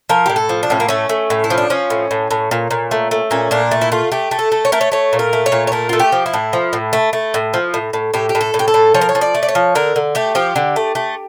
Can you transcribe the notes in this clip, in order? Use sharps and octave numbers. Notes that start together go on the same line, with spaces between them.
F3 A#4
A2 G4
A4
F3
D4
A2 C#4
A#3
A3 C#4
A3
A2
E4
F3
D4
F3 C#4
A2
A2
A2
A#2
A#2
A3
A3
A#2 C#4
A#2 D4
A3
E4
A3 F4
A3 G4
A3
A4
A3
C#5
A3 A#4
C#5
A3 C#5
A#2
A#4
A3
C#5
A#2
C#5
A3 A#4
A3 F4
G4
F3
E4
A2
F3
A2
A3
A3
A2
F3
A2
A2
A2 G4
G4
A2
A4
A2
G4
A4
A2
F3 C#5
A#4
C#5
F3
D5
A3
D5
C#5
F3
D3 A#4
D3
A3 G4
F3 G4
D3
A3
A3